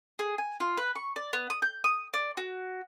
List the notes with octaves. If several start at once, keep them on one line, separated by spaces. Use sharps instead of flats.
G#4
G#5
F4
B4
C#6
D5
B3
D#6
G6
D#6
D5
F#4